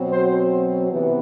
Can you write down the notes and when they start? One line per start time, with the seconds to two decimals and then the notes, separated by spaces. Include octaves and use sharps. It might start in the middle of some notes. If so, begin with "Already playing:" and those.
Already playing: B2 F#3 C4
0.09 C5
0.91 C3 E3 B3